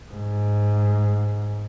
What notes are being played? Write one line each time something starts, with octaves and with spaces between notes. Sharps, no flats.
G#2